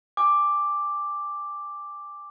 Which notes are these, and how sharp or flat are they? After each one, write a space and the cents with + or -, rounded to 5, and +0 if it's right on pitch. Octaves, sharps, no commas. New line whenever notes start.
G#5 -20 D6 +0